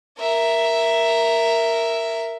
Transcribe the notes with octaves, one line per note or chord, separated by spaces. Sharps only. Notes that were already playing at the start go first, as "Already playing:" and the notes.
A#4 E5